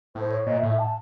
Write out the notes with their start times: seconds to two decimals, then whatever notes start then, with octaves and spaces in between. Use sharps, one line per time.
0.15 A2 C5
0.31 C#5
0.46 A#2 D#5
0.58 E5
0.63 A2
0.69 E5
0.79 A5